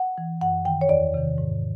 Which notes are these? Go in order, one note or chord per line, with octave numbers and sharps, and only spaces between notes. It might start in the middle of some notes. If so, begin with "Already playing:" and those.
Already playing: F#5
E3
F#2 F#5
D#3 G5
C#5
E2 D5
C3 D#3
G#2